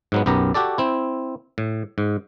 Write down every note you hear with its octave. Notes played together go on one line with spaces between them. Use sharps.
G#2 F#3 B3
B1 F#2 B3 G4 A#5
F#4 G4 A4 D5
C4 E4
A2
G#2